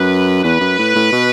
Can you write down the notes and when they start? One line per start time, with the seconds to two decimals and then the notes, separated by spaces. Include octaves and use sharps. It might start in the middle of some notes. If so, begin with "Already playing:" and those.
Already playing: F#2 B4
0.43 E2 B4
0.60 F#2
0.78 A2
0.95 A2
1.12 B2